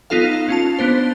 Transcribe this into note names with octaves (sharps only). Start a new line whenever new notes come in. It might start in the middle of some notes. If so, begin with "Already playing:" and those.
B3 D#4 F4 A4 F5
C#4 F4 A5
B3 D4 C5